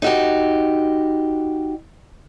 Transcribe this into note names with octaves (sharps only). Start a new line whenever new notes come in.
D#4 F#4 G4